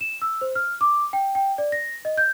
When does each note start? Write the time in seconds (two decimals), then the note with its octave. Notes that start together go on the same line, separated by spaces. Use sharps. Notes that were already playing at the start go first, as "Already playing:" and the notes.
0.01 E7
0.22 E6
0.41 C5
0.55 F6
0.81 D6
1.13 G5
1.35 G5
1.58 D5
1.72 A#6
2.05 D#5
2.18 G6